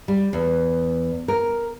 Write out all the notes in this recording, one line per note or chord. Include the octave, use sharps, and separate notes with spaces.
G3
E2
A#4